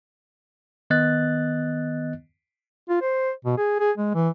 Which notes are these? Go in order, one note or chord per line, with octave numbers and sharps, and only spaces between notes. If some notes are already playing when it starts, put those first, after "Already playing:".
D#3 B3 D#5 F#6 A6
F4
C5
B2
G#4
G#4
G#3
E3